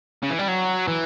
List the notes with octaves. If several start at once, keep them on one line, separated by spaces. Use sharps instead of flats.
C#3
E3
G3
F#3
E3